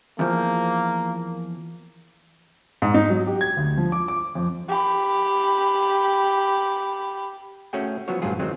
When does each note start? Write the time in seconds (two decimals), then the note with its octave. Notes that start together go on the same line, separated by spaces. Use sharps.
0.19 E2 F3 A#3
2.82 G#2
2.94 D#4
3.10 F#3
3.27 G4
3.41 G#6
3.57 D2
3.77 F3
3.92 D6
4.08 D6
4.35 F2
4.69 G4 B5
7.73 A3 C#4 F#4 G#4 G5
8.08 F3 F#3 B3 F#4 C#5
8.22 A1 G2 F#3 F4 G#4
8.39 D#3 F#3 G#3 C4